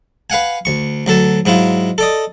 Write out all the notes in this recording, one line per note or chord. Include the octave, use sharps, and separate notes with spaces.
B4 F5 F#5 G#5
D2 C#6
D2 F#3 A4 A5
G#2 F#3 E4 F4
A4 D5 D#5